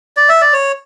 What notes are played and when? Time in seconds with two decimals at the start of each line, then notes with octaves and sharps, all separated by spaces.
0.17 D5
0.29 E5
0.41 D5
0.53 C#5